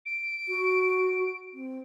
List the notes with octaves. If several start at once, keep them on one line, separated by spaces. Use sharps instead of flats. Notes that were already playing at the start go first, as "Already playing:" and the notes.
D7
F#4
C4